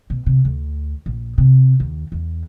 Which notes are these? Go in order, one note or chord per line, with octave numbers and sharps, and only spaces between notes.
B2
C3
D2
A#1
C3
D#2
E2